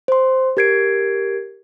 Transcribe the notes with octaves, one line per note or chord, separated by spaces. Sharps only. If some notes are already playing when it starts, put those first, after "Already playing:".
C5 C6
G4 A#4 G#6 C7 D7